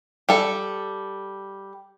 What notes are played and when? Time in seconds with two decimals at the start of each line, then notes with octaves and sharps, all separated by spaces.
0.29 G3 A4